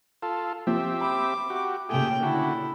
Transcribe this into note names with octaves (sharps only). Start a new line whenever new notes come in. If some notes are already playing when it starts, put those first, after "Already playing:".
F4 A4
F3 C4 G4 E5
B5 D6
F#4 G4
A#2 C#3 A3 G4 G#4 G5
D3 E4 F#4